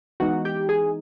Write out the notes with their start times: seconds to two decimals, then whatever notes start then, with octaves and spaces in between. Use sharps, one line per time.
0.20 E3 G#3 B3 D#4 F#4 F#5
0.45 G4 G5
0.69 G#4 G#5